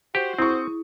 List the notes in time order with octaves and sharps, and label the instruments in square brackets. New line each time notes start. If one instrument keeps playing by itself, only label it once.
[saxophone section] F#4 C5 [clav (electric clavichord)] G4
[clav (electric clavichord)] C4 [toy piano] E4 G#4 [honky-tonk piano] C#6 D#6